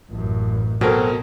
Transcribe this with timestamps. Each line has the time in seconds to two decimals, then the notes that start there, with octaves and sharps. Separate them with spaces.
0.10 A1 F#2
0.81 B2 F#3 C4 A4 A#4